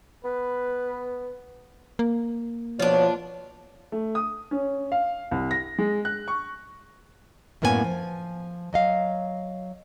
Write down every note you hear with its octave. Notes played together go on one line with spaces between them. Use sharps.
B3 B4
A#3
B2 F3 D4 F4 C#5
A3
D#6
C#4
F5
C2
A#6
G#3
F#6
C#6
F#2 A2 A#3 B3 A#4 G#5
F3
F#3 D#5 F5